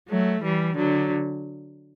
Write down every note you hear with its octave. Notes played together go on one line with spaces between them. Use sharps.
F#3 A3
E3 G3
D3 F#3